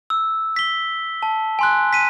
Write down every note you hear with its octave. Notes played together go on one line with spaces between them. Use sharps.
E6
B6 G7
A5
G#5 C6 F#6
B6 D#7